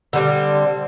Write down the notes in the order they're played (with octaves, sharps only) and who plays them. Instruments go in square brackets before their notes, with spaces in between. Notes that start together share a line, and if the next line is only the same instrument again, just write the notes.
[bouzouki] D3 G3 C4